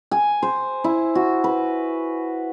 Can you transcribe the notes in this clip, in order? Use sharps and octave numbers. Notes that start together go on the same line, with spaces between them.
G#5
C5
E4
F#4
B4